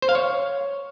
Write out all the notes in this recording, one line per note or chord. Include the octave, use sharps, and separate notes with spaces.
C5
F5
C#5